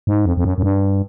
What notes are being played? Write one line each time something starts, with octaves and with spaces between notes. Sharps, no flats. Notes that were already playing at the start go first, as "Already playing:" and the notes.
G#2
F2
F2
F#2
F#2
G2